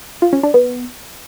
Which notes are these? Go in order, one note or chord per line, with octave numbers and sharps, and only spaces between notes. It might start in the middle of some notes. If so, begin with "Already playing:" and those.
F4
C#4
D4
B3